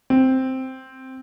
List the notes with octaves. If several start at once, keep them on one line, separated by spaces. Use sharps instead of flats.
C4